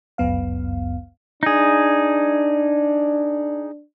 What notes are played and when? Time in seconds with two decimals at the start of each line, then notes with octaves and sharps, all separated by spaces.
0.18 G1 C#2 F#2 B3 F5
1.43 D4 D#4 G#4